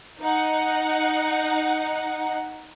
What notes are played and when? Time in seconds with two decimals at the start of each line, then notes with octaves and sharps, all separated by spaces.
0.22 D#4 F#5